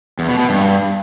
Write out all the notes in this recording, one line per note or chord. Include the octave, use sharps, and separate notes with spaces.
E2
B2
B2
G2